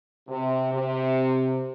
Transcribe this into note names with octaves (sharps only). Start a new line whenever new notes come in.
C3
C3